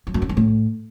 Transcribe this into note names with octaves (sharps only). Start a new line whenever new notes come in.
F#3
F#2
G2
F3
A2